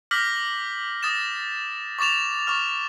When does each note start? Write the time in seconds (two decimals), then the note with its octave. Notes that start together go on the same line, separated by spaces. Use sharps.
0.11 D6 F6 G6 A#6 B6 F#7
1.03 D#6 A6 A#6 E7
1.99 C#6 D6 A6 E7 F7
2.47 C#6 D6 F6